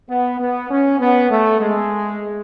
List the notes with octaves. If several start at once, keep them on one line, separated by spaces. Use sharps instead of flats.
B3
B3
C#4
B3
A3
G#3